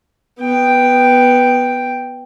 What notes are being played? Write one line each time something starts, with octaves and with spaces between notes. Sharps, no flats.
B3 G5